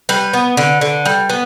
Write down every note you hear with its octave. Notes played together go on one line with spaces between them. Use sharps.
G3 B4
B3
D3
D3
G3
B3